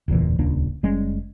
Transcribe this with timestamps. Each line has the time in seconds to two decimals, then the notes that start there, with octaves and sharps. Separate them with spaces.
0.08 E1 C#2 A#2 E3
0.39 D#1 C#2 A#3 D4
0.83 F#1 G3 G#3 C#4